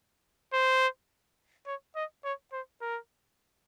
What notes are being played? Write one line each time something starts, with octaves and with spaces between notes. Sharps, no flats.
C5
C#5
D#5
C#5
C5
A#4